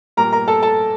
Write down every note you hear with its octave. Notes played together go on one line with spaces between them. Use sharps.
A#2 G3 A#3 A#4 A#5
A#4 A#5
A4 A5
A4 A5